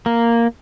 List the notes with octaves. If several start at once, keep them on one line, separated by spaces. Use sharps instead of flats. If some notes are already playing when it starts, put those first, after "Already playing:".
A#3